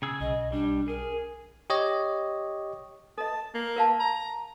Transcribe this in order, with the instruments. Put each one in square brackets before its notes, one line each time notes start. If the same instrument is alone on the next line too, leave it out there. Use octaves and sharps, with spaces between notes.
[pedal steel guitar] C#3 G#4 E6
[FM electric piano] B1 [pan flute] D#5
[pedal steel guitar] G3 [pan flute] D4
[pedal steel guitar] G#4 [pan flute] A#4
[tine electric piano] G4 C#5 D#5
[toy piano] A4 D#5 [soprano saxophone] A5
[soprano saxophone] A#3
[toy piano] A#4 F5 A5
[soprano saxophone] A#5